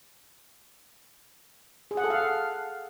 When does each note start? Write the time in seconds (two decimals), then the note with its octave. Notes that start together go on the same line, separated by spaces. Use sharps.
1.91 G#4
1.97 F#5
2.04 A4
2.10 F5